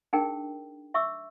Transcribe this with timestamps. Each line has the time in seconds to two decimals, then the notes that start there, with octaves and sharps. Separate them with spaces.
0.13 D4 D#4 G#4 A#4 G5
0.94 E5 C#6 D6 E6